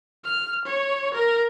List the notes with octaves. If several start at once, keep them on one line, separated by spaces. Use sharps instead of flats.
F6
C#5
A#4